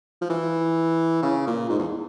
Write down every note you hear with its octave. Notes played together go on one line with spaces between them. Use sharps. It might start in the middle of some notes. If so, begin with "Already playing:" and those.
F3
E3
C#3
A#2
G#2
E2